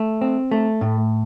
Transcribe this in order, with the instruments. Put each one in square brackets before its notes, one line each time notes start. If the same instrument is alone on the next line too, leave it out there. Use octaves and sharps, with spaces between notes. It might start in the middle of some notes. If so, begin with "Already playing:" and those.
Already playing: [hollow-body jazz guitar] A3
C4
A3
A2